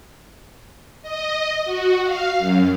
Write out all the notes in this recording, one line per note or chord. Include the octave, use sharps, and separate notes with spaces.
D#5
F#4
F5
F#2